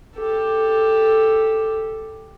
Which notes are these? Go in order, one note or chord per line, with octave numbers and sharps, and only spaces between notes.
G4 A4